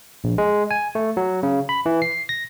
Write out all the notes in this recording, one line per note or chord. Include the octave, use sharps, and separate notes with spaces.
A#1
G#3
G#5
A3
F#3
C#3
B5
E3
C7
A#6